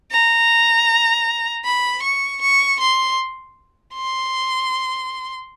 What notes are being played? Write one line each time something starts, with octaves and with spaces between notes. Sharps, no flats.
A#5
B5
C#6
C#6
C6
C6